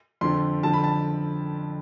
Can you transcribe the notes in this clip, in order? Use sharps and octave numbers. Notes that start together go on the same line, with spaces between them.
F2 D3 F3 C6
F2 D3 F3 A5
B5
A5